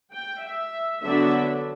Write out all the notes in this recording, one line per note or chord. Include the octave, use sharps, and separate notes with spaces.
G5
E5
D3 F#3 B3 D4 E5